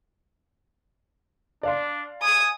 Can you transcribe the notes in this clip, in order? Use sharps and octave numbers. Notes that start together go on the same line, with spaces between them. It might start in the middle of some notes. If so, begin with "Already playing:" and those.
D4 D5 F5 C6
G#5 D#6